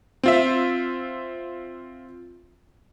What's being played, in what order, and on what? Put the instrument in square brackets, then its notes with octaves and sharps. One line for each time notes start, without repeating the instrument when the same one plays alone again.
[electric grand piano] C4 F4 E5